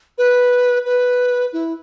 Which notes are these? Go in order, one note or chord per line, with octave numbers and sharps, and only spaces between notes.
B4
B4
E4